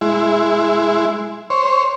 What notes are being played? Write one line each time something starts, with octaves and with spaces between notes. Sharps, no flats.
G#3 E4
C5 C#5